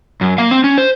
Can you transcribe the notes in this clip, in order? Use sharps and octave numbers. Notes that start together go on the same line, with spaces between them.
F#2
A#3 F5
C4
C#4
C5